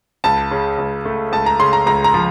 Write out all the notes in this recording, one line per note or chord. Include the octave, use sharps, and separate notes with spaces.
C#2 A5
C#3
C#2
A3
C#2 A5
A#5
C#3 C6
A#5
C#2 A#5
A#5
F3